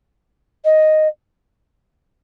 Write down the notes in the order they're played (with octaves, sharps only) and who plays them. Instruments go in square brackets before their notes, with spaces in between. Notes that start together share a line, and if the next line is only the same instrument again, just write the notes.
[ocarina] D#5